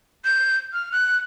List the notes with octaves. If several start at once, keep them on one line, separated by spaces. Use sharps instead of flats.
G6
F6
F#6